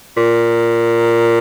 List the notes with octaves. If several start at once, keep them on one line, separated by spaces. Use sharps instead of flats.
A#2